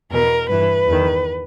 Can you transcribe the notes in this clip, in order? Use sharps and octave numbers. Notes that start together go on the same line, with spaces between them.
E2 B2 A#4
G2 E3 B4
E2 D#3